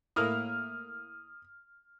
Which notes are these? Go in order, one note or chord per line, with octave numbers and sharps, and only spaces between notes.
A2 A#3 E4 D#6 F6